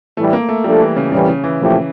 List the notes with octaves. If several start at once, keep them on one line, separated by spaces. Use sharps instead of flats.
A2 E3 G3 A3
A#3
A3
F3 G3 A3 D4 A4
E3
C#3
A2 C#3 E3 G3 A#3 C#4
C#3
E3
A#2 F3 A3 E4 G4